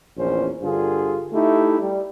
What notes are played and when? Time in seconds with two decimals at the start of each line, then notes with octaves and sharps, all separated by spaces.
0.17 A#1 E2 C#4 C5
0.62 G2 D3 F4 G#4
1.33 A3 D#4 E4 G4
1.80 G3